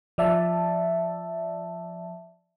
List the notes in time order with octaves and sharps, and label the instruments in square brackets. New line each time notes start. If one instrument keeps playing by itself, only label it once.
[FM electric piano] F3 D5 E5 A5